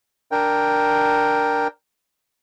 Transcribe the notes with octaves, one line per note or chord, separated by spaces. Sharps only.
D4 A#4 G5